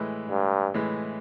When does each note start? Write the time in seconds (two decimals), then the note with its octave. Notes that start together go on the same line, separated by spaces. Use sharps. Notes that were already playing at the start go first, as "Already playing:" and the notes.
Already playing: A2 E3 G#3
0.28 G2
0.74 A2 E3 G#3